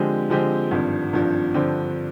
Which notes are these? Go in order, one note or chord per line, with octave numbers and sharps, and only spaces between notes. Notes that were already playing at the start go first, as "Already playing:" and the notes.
Already playing: D3 F3 G#3 C4 G4
D3 F3 G#3 C4 G4
G#1 G2 F3
G#1 G2 F3
G2 D3 F3 C4